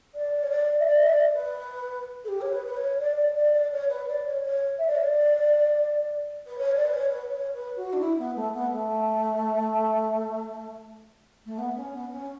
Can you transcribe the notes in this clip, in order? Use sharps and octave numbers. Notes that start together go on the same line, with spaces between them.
D5
C#5
D5
E5
D5
E5
D5
B4
A4
G4
C#5
B4
B4
C#5
D5
D5
D5
D5
C#5
B4
D5
C#5
C#5
E5
D5
C#5
D5
B4
C#5
D5
B4
C#5
B4
C#5
B4
F#4
D4
E4
B3
A3
B3
A3
A3
B3
C#4
B3
C#4